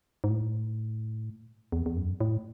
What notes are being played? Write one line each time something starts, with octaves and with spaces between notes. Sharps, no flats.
G#2
A2
E2
E2
F#2
A2